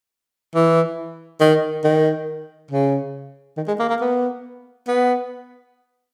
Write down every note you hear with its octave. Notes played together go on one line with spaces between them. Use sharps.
E3
D#3
D#3
C#3
D#3
G#3
A#3
A#3
B3
B3